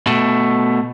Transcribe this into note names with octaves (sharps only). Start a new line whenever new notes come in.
B2 A3